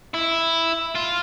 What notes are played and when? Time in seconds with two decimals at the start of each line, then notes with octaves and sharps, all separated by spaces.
0.14 E4
0.95 F4